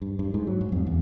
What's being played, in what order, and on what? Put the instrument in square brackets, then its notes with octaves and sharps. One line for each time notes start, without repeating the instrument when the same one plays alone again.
[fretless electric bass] G2
G2
G#2
F#3
G#2
F2
E2